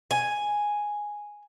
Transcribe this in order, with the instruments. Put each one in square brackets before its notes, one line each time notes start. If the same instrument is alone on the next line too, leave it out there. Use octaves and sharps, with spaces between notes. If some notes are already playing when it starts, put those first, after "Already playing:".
[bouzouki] G#5